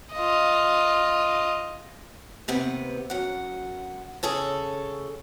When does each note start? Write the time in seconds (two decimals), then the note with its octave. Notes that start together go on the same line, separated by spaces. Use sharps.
0.14 F4 D#5
2.48 D#2 C3 B3
3.10 F#2 F#5
4.23 C#3 G#4 A4 C#5